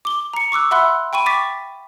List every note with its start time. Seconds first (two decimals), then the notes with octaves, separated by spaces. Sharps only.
0.05 D6 G7
0.34 A#5 C#7
0.52 C#6 D6 E6 F#6
0.71 E5 F#5 B5 C6 E6 F#6
1.13 G5 B5 C#6 D#7
1.26 C#6 D6 A6 B6